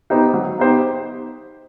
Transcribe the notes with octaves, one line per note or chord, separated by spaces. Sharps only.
B3 D#4 G4 C5
F#3
B3 D#4 G4 C5